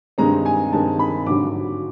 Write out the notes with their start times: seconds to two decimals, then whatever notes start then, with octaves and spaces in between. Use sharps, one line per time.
0.18 G2 D#3 G#3 C4 A#5
0.46 G#5
0.73 G2 D#3 G#3 C4 A5
0.99 B5
1.27 G#1 G2 D3 F#3 D6